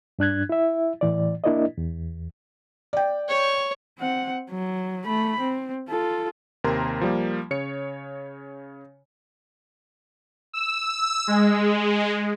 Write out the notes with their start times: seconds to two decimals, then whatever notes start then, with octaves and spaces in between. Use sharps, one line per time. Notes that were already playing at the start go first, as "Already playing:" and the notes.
0.19 G2 D4 F#6 G#6
0.49 E4 E5
1.01 A2 E3 D5
1.44 A#3 D4 E4 A#4 D5 D#5
1.78 E2
2.93 D5 G5
3.29 C#5
3.99 C4 F#5
4.51 F#3
5.05 A3 B5
5.40 C4
5.89 F4 A4
6.64 D#2 C3 A#4 A#5 C6 G#6
7.01 F3 G3 A#3
7.51 C#3 C#5 C#7
10.53 E6
11.27 G#3